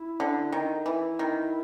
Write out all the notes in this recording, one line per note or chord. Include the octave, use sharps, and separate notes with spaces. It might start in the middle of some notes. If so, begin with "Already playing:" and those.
Already playing: E4
D3
D#3
E3 E4
D#3